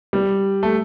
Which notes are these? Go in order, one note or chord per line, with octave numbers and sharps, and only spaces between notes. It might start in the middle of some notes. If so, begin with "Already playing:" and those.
G3
A3